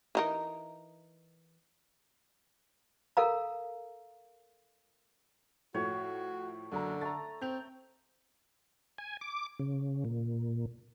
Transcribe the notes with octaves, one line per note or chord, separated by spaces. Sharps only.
E3 D#4 A#4
A4 A#4 F5 A#5
A2 F3 A3 F#4 C#5
F#1 F#2 D3 A#5
A3 A#5 A6
C4 G6 F7
G#5
D6
C#3
A#2